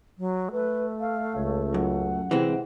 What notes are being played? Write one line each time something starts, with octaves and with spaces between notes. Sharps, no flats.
F#3
A3 B4
F5
C#2 C#5
F#2 F#5
C3 E3 G#3 C4